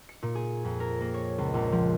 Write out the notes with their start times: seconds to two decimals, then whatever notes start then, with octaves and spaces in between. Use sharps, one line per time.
0.09 C#7
0.23 A#2
0.35 G#4
0.64 F2
0.80 A#4
1.01 A#3
1.14 C#5
1.38 C#2
1.54 A#1
1.72 F3